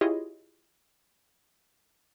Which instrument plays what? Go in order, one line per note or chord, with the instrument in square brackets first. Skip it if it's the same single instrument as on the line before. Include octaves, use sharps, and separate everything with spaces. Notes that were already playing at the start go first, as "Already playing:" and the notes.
[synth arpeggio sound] E4 F4 G4 G#4 C#5 D#5